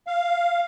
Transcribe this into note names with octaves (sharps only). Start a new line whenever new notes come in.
F5